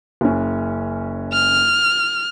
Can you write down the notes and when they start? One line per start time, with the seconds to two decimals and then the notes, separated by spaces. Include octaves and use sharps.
0.21 F#1 C#4
1.33 F6